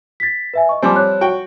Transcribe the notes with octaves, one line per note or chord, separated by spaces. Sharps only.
A6 B6
B4 E5 G#5
D#5 C#6
F3 G3 C4 G#5 C6 D6
C#5 F#6
F#4 G5